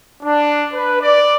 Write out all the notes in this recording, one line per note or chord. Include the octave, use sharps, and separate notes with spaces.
D4
B4
D5